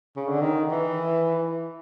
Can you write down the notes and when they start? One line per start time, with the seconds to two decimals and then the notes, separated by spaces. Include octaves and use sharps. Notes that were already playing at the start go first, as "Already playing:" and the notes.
0.16 C#3
0.29 D3
0.41 D#3
0.71 E3